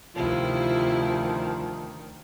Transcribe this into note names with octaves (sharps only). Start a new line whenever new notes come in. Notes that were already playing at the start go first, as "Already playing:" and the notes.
D2 C3 D#3 F3 E4 F4